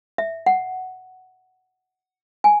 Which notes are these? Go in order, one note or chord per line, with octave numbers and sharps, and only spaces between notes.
E5
F#5
G#5